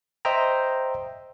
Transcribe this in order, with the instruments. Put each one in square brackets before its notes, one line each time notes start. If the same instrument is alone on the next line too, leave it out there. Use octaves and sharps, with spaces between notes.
[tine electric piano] C5 D#5 E5 G5 A#5